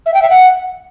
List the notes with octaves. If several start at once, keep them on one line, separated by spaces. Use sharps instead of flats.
E5
G5
E5
F#5